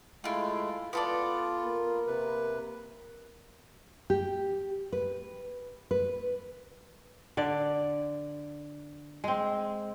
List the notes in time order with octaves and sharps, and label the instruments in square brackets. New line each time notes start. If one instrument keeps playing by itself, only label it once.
[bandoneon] G#3 A3 [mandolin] E4 F4
[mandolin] B3 A4 D5 [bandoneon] F4
[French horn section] A#3 A#4
[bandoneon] C3 B4
[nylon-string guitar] G4
B4
B4
[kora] D3 D5
G#3 C4